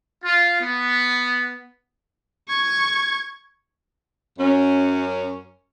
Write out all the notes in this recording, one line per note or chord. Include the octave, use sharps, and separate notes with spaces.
F4
B3
C#6 G#6
F#2 C#4